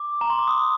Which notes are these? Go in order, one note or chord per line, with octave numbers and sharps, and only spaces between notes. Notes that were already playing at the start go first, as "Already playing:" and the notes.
Already playing: D6
A#5
C6
D6
D#6